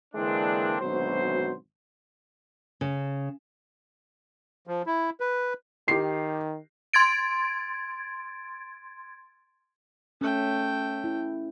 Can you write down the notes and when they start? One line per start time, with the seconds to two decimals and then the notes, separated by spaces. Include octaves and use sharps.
0.14 D3 E3 G#3 A#3 C4 D4
0.81 G#1 D2 B2 F#3 C5
2.81 C#3
4.67 F3
4.86 E4
5.20 B4
5.88 D#3 G4 C7
6.93 C6 G#6 A6 D7
10.21 A3 C#4 G5
11.04 E4